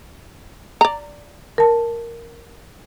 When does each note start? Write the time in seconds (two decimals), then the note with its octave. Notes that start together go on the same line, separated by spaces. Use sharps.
0.81 D5 A#5
1.58 A#4 A5